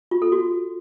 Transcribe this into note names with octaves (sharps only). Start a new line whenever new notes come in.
F4
A4
F#4